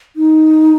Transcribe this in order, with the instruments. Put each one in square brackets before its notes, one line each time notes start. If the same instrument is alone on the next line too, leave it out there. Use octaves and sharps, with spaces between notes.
[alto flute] D#4